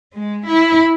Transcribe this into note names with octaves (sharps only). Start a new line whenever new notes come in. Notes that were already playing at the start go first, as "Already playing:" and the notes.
G#3
E4